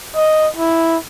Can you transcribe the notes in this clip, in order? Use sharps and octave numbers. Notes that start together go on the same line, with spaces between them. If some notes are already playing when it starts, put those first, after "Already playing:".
D#5
E4